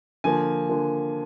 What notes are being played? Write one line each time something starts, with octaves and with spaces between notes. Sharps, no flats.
D3 F3 A#3 G#5
D3 F3 A#3